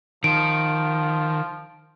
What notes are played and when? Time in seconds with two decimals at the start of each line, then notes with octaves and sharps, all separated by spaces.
0.24 D#3 F3 D7